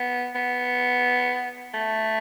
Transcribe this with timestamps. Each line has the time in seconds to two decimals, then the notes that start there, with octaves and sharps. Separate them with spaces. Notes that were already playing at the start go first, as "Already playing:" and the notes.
Already playing: B3
0.35 B3
1.74 A3